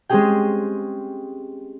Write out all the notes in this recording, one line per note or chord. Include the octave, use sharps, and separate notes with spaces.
G#3 C4 C#4 G4 G#4 G5